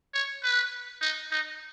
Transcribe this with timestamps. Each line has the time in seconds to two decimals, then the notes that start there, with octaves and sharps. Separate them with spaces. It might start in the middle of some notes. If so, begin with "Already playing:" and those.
0.14 C#5
0.43 B4
1.01 D#4
1.31 D#4